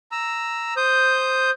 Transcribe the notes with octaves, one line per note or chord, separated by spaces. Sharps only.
A#5 E6
C5 D#6 G6